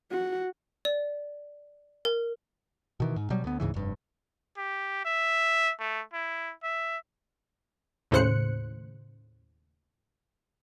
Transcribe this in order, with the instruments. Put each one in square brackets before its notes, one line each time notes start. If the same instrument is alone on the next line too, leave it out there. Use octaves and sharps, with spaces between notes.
[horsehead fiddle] F#4
[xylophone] D5
A#4
[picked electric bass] B2 D#3 E3
G#2
B2 F#3 G3
D2 B3
D2 G#2 C#3 E3
F1 G2
[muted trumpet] G4
E5
A3
E4
E5
[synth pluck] D#2 A2 C#3 C5 F#6 C#7